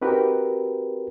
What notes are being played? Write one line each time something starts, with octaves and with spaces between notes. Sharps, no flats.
C4 D#4 F#4 G4 A#4 B4